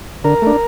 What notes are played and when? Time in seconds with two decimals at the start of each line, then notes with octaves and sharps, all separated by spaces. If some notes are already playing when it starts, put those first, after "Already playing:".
0.24 D3 A#4
0.42 A3 D4